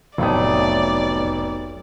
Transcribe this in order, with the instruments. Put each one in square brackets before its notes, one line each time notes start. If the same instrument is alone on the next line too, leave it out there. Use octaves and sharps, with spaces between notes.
[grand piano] F1 C#5 D#6 [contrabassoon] B1 [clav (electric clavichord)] F2 A2 A3 [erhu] D5